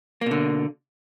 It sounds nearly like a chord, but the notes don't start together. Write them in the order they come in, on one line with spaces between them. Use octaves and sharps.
A#3 B2 D3